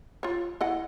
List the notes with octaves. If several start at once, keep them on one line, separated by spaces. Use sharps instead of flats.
F4 C#5
E4 D#5 F#5